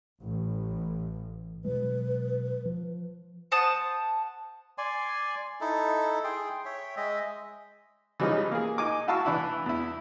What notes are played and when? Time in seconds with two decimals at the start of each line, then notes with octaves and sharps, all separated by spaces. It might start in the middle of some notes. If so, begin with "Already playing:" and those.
0.21 A1
1.65 B2 F#3 G#3 B4
2.65 F3
3.52 C5 F#5 A5 D#6
4.78 D5 G#5 C6
5.61 D#4 E4 A4
6.24 G#4 G5 C6
6.65 C#5 E5 G5
6.97 G#3 D#5 E5
8.20 E3 F3 G3 G#3 C#4 D#4
8.51 A#3 G#4
8.78 D#4 G#5 D6
9.08 E4 F#4 F5 A5 C#6 E6
9.26 E3 D4 E4
9.66 E2 E4